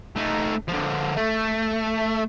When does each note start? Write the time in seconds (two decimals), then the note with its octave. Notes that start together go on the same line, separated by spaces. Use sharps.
0.16 A3 D#4
0.68 D3 F3
1.17 A3